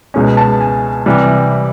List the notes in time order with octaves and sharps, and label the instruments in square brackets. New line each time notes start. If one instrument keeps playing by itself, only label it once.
[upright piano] C#2 B2 G#3 C#4
A5
G#5
C3 E3 G3